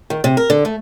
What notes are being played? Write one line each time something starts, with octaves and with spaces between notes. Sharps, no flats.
D#3
C3
A#4
D3
A3